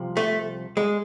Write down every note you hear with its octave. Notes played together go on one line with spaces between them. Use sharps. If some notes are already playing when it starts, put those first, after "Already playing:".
Already playing: C2 C3 F3
A3
G#3